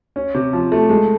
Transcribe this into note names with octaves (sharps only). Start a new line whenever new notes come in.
C#4
C3
F3
A3
G#3